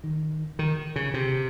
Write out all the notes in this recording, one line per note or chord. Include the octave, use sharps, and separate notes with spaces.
D#3
D#3
C#3
C3